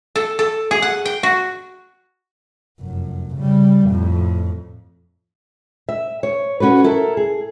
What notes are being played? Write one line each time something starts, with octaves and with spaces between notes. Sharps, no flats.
A4
A4
G#4
F#5
G5
F#4
F1 F#2
C#3 G3
F2 A2
E5
C#5
C#4 F#4 A4 B4
E4 A4 A#4
G#4